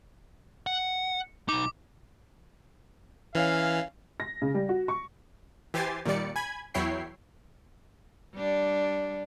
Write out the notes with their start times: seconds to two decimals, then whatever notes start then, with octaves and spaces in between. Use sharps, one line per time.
0.67 F#5
1.49 B1 D#4 D6
3.35 E3 C#4 F5
4.20 A#6
4.42 C#3
4.54 G3
4.69 F#4
4.88 C#6
5.74 E3 G4 C5 G#5 A6 C7
6.05 A#2 D#3 G3 D5 C#7
6.36 G#5 B5 G#6
6.74 E2 F#3 E4 C#5 G5 C7
8.35 G3 D4